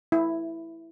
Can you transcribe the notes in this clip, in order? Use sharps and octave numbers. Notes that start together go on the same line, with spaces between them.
E4